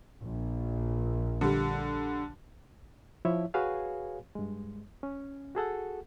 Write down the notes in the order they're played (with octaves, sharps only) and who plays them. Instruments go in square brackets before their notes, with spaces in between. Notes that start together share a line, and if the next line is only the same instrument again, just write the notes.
[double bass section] A#1
[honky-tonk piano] D3 G3
[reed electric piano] F3 E4 C#5 E5
F#4 G#4 B4 C#5 F5 G#5
G2 G#3
C#4
F#4 G#4 A4 F#5